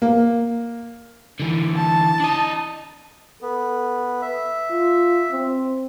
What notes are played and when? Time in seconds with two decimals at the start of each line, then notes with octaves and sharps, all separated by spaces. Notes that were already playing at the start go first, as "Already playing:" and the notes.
0.02 A#3
1.40 D3 E3
1.76 A5
2.20 D4 D#5
3.42 B3 A4
4.22 E5
4.70 F4
5.31 C4